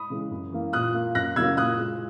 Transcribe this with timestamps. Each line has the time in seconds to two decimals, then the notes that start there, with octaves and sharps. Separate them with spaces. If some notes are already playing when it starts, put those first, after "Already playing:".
Already playing: B5 D#6
0.10 C#3 E3 G#3
0.31 F#2
0.52 E3 A#3
0.73 A#2 D#6 F#6
0.94 A#3
1.15 F#2 F#6 A#6
1.36 C#3 F#3 A#3 E6 G#6
1.57 A#2 D#6 F#6
1.78 G#3